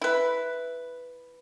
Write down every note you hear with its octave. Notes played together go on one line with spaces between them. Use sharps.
E4 B4